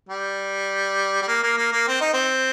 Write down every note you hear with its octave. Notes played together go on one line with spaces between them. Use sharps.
G3
G3
A#3
A#3
A#3
A#3
C4
D#4
C4